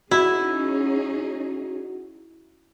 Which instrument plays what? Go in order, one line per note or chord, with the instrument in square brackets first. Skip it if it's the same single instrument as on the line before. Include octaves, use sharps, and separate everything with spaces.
[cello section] C#4 D#4 G#4 [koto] E4 [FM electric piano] F#4